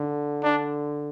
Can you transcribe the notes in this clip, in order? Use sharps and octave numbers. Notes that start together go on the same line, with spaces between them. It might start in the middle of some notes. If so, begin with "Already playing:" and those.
Already playing: D3
D4